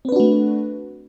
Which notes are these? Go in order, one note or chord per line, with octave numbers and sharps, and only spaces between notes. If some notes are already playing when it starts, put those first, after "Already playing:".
A3 C4 D4 F#4 B4